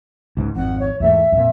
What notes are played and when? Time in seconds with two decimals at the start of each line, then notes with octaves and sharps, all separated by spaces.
0.37 C#2 G#2
0.55 G#1 F2 F#5
0.79 C#5
1.00 E2 G#2 A3 E5
1.32 F2 A#2